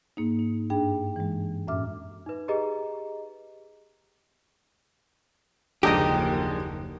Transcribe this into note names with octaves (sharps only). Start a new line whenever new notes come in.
G#2 A#3 D#4
D#4
G2 D4 G#4 G5
E3 G#3
F#2 A2 C#4 E5 D6 F6
D#4 B4
G4 G#4 B4 D#5 A#5 D6
F#1 D#2 D3 F3 G#3 D#4 G4 D#5